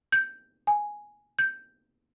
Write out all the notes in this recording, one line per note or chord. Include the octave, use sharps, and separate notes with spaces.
G6
G#5
G6